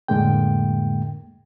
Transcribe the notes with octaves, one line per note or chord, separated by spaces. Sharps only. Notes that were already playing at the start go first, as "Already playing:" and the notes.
F2 A2 D3 G#3 A#3 G5